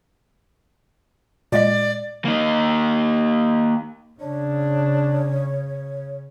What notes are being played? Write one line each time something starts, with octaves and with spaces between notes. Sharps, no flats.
A#2 G#3 D5 D#5
A#3 D#4
C#3 D4 C#5